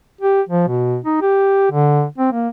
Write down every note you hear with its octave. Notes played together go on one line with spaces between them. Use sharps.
G4
F3
B2
D#4
G4
D3
C4
A#3